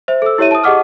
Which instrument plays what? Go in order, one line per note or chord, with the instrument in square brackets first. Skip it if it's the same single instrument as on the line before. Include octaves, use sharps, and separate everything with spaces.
[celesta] C5 E5
A4 E6
E4 G4 C#5 E5 D#7
A5 D#6
G4 G#4 D#5 F#5 D6 F6